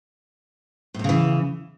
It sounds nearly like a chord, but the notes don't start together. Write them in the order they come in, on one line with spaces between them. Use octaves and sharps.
A2 E2 C#3 E3